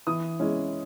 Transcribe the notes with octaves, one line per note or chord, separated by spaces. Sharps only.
E3 D#6
G#3 C#4 E4